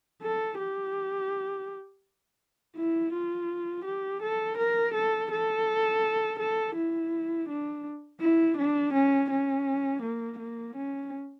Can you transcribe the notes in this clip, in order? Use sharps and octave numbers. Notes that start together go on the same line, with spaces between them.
A4
G4
E4
F4
G4
A4
A#4
A4
A4
A4
E4
D4
E4
D4
C#4
C#4
A#3
A#3
C#4